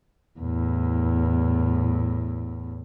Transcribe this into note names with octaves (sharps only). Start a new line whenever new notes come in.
E2 A2